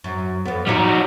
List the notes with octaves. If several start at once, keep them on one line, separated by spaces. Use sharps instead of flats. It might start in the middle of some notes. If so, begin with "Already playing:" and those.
F#2
F2 B3
A#2 F#3 G3 D#4 F#4